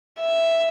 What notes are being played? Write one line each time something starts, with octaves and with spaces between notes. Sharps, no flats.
E5